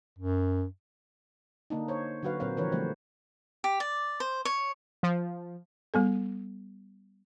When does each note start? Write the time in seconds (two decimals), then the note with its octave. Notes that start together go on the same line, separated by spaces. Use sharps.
0.19 F#2
1.70 D3 A#3 D4 D#4
1.88 C5 C#5
2.23 D3 F#3 F#4 B4 F5
2.40 A#2 F#3 C4 A#4 C5 F5
2.57 D3 E3 F3 A#4 B4 C#5
2.72 D3 F3 G3 A3 B3 C5
3.64 G4
3.80 D5
4.20 C5
4.45 C#5
5.03 F3
5.94 G3 B3 A4